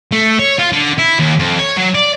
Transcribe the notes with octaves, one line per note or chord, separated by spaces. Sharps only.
A3
C#5
F4
D3
E4
D#2
F2
C#5
F#3
D5